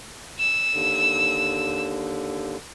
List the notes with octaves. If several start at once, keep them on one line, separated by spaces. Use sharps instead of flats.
E6
D#2 D3